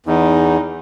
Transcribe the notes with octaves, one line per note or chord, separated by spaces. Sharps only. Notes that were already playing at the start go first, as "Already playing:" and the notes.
E2 D#4